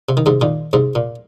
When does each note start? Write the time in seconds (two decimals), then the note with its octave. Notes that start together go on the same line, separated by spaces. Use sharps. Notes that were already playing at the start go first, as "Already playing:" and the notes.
0.09 C3
0.17 D#3
0.26 G#2 C3
0.41 A#2 D#3
0.73 G#2 C3
0.95 A#2